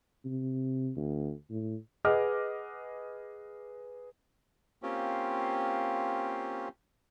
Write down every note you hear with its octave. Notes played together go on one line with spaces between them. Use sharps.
C3
D2
A2
G#4 B4 D#5 F#5 D6 F6
A#3 C4 C#4 F4 G4